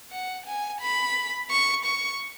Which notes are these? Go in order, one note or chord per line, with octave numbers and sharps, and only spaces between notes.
F#5
G#5
B5
C#6
C#6